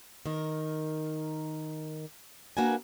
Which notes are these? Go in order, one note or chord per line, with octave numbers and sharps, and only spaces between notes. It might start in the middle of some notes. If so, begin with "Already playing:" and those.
D#3 A#4
A#3 D4 F#4 A#4 B4 G#5